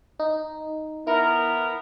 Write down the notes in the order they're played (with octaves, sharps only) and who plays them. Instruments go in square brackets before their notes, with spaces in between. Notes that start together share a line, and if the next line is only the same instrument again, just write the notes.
[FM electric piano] D#4
[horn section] B3 A#4 [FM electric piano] E4